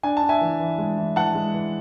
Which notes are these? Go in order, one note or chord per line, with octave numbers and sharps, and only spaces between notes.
D4 G#5
A5
D4
E5 G#5
E3
E3
G#3
E3
E3 F#5 A5
G#3
E3